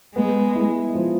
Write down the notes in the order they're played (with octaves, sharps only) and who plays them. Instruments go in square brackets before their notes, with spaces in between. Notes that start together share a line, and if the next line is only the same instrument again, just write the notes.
[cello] G#3 [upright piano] B3
[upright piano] E4
F3